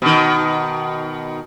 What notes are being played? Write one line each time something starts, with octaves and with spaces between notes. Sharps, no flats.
B2 D#3